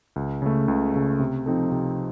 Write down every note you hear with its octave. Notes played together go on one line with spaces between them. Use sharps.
C#2
C#3 A3
C#2
C#3 A3
C3
F3 C4 D#4 A4
C3